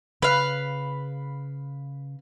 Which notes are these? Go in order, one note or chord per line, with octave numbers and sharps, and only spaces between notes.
C#3 B4 F5